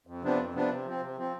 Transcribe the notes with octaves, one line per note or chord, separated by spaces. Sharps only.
F2
C3 F3 B3 D4
F2
C3 F3 B3 D4
C3
F3 C4
C3
F3 C4